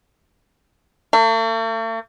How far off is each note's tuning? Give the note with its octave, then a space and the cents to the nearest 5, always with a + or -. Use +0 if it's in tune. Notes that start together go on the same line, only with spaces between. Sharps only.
A3 +45